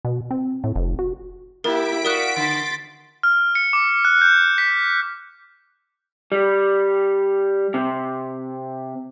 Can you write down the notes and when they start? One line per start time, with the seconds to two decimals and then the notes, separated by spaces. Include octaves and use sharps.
0.05 B2
0.31 C4
0.64 A2
0.76 F1
0.99 F#4
1.64 A#3 E4 G4 A#4 B6 D7
2.05 F#4 A#4 D5 F5 D#6 F#6
2.37 D3 C6 A6
3.23 F6
3.55 C#7
3.73 D6
4.05 F#6
4.21 G6
4.58 B6
6.32 G3
7.74 C3